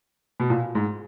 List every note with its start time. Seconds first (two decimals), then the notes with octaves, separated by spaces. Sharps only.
0.40 B2
0.50 A#2
0.75 G#2